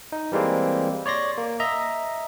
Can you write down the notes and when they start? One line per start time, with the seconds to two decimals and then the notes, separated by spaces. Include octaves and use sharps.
0.12 D#4
0.32 E3 G3 G#3 A#3 C4
1.06 C#5 D5 C6 A#6
1.37 A#3
1.60 D#5 E5 A#5